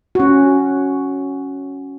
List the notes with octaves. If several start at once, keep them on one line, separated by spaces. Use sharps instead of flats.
C#4 F#4